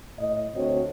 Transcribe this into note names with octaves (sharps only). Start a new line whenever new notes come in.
A2 D#5
D2 C4 F#4 C#5 D#5